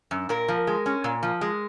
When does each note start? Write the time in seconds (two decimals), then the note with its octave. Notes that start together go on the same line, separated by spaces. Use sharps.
0.11 F#2
0.29 A#2 A#4
0.48 F3
0.67 G#3
0.86 C#4
1.04 A#2
1.23 F3
1.41 G#3